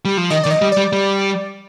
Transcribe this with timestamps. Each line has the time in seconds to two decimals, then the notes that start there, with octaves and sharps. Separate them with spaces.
0.05 G3
0.17 F3
0.30 D#3 D#5
0.44 D#3 D5
0.51 D#5
0.62 G3
0.72 D5
0.77 G3
0.93 G3